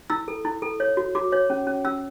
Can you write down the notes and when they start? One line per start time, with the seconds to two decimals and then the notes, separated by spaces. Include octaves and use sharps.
0.10 E4 E6
0.28 A4
0.45 E4
0.62 A4
0.80 C#5
0.97 F#4
1.15 F#4 D6
1.32 C#5
1.50 C#4
1.67 C#4
1.85 C#4 E6